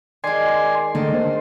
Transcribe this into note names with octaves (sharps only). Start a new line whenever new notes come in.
D#3 G#3 D5 G#5 C6
D3 D#3 A3 A#3
C5